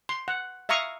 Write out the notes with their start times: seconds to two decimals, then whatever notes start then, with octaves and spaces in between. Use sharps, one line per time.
0.09 C6
0.28 F#5
0.69 E5 F5 A#5 C#6 D#6